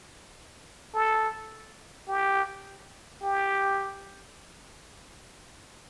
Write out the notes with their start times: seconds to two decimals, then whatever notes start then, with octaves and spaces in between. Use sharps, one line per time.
0.94 A4
2.08 G4
3.23 G4